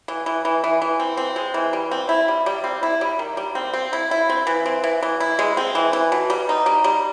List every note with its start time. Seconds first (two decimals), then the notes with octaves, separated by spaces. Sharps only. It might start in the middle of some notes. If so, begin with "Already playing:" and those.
0.08 E3
0.26 E3
0.45 E3
0.64 E3
0.82 E3
1.00 C4
1.17 C4
1.36 G#3
1.54 E3
1.73 G3
1.91 C4
2.09 E4
2.28 G3
2.46 G3
2.64 C4
2.83 E4
3.01 G3
3.19 D#3
3.37 G3
3.55 C4
3.73 C4
3.93 E4
4.11 E4
4.30 C4
4.47 E3
4.66 C4
4.84 E3
5.03 E3
5.20 E4
5.39 G#3
5.57 C4
5.75 E3
5.93 E3
6.12 B2
6.30 G3
6.49 D#4
6.66 G3
6.84 G3